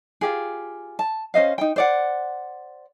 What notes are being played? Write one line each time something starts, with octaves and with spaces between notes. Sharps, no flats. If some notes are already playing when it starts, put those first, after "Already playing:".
F4 G4 G#4
A5
C#4 C5 D#5 F5
D#4 G5
C5 D5 F#5